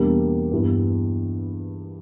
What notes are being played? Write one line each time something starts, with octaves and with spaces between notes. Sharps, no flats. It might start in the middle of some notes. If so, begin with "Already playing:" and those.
Already playing: E2 B2 G3 A#3 D4
G2 E3 G3 B3